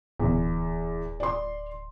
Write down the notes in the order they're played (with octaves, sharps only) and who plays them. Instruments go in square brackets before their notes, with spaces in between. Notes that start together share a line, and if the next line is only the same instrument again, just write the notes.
[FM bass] D1 [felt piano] E2
[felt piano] D5 C6